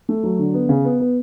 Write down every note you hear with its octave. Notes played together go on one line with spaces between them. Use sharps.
A3
F#3
D3
B3
C#3
B3
B3